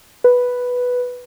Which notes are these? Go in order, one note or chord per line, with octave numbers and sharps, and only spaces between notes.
B4